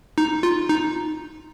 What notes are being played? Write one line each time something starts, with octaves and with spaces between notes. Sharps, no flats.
D#4
F4
D#4